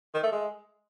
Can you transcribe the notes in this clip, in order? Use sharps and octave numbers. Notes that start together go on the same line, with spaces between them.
D#3
A3
G#3